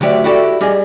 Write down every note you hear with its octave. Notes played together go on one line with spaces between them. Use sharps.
D2 F#3 G4 D5 E5
E4 F#4 G4 A4 D5
G3 G4 G#4 D#5